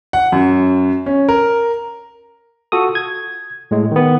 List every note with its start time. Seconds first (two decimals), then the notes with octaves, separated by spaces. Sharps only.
0.13 F#5
0.32 F#2
1.06 C#4
1.29 A#4
2.72 F4 F#4 A4 D#6
2.95 G#6
3.71 A2 G#3
3.91 D#3 B3